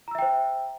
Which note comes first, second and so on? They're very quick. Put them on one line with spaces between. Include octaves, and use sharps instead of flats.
A#5 E6 E5 G5 C5